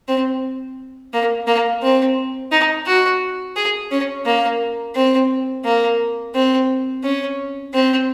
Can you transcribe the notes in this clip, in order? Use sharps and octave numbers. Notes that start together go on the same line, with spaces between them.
C4
A#3
A#3
C4
D#4
F#4
G#4
C#4
A#3
C4
A#3
C4
C#4
C4